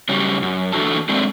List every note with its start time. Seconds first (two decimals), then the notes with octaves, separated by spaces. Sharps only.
0.09 C#3 F#3 G3
0.42 F#2
0.72 E3 A3 D4 F#4 A4 A5
1.09 F#3 G#3 A3 C4 D4